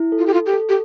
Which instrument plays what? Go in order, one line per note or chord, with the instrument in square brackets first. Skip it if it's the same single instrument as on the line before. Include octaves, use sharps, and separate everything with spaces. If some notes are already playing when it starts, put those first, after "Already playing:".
Already playing: [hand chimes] E4
A4
[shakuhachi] F4
G4
[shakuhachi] F4 [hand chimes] A4
[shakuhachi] G4
[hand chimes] A4
[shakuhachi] G4